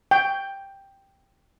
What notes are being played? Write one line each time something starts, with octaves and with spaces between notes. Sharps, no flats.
G5